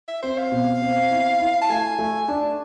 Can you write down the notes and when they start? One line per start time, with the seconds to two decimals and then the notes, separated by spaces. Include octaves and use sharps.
0.08 E5
0.22 C4 C5
0.38 F5
0.52 B2
0.82 C4
1.11 E4
1.39 E4
1.61 A5
1.70 A3 G#5
1.99 A3
2.28 D4 A5